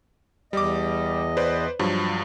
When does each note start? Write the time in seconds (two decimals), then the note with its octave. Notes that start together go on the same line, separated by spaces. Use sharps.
0.53 E2 G3 D#5 D6
1.37 B4 C5 D5
1.79 G2 F3 F#3